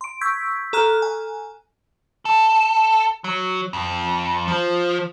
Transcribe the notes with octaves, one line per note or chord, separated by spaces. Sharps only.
C6 D7
C#6 E6 G6 G#6 B6
A4 A#5 F6 F#6
G#5
A4
F#3
F2
F3